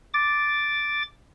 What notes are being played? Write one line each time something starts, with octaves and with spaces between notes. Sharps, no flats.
D6 A6